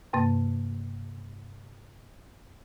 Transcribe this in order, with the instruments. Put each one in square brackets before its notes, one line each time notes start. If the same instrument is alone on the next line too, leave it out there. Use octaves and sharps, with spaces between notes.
[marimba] G2 C3 A#3